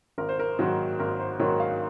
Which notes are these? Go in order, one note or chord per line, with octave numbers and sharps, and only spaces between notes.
G#1 A#4
C5
A#4
G#2 D#3 F#3 A#3
G#1 A#4
C5
G#2 D#3 F#3 A#3 C#5
F5